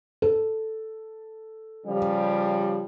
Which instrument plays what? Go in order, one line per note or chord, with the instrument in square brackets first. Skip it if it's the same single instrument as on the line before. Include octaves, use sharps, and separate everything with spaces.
[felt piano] A4
[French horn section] C#3 F3 G3